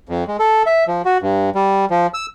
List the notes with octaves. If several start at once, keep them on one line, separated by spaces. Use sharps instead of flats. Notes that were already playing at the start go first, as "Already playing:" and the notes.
F2
G#3
A4
E5
F3
F#4
G2
G3
F3
E6